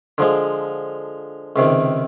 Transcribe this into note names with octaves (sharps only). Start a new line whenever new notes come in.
D3 F3 G#3
C#2 C3 D#3